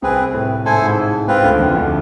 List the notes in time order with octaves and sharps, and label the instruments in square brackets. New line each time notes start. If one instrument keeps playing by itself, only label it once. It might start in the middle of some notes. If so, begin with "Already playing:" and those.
[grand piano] C2 C3 [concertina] C4 G#4 B4
[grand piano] A2
[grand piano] G#2 [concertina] E4 A4 C5 G#5
[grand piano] A2
G#2
[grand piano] G#2 [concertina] C4 F4 B4
[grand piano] D2 D3
F2 F3
D2 D3